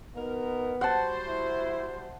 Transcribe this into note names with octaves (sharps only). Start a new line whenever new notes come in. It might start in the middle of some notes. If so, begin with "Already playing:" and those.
B2 B3 D#4 A#4
G3 F#4 C5 F#5 A5
E4